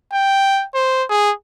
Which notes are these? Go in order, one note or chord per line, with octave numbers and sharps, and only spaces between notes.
G5
C5
G#4